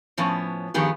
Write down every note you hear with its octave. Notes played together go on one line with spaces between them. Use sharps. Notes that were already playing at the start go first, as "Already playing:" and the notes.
A2 F3 B3 C#4
G2 D#3 F3 B3 G4 G#4